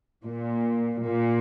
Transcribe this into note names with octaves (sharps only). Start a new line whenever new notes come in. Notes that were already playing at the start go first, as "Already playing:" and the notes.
A#2
A#2